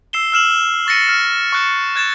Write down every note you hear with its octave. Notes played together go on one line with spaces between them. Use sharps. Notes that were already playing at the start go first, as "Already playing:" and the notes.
E6 C7 E7 G7
E6 F6 E7 F#7
C#6 A6 A#6 C#7 D#7
E6 F6 G7
C#6 F#6 C#7
F#6 G#6 A6 E7